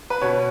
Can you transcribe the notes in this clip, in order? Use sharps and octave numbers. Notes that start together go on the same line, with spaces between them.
B4
B2 C#5